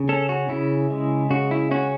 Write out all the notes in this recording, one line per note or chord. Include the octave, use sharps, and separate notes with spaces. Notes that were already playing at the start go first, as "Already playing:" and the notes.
Already playing: C#3
C#4 A4
F#4
C#3 E4
G#3
C#3 F#4
E4
C#4 F#4